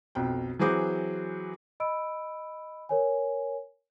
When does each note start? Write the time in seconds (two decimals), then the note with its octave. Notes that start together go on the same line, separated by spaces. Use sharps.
0.15 B1 F2 G5
0.59 E3 F#3 C4 G#4 D6 G6
1.80 D#5 B5 E6 D7
2.89 A#4 C#5 G#5